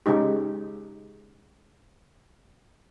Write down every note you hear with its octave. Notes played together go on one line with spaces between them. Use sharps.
C#3 G#3 D#4 G4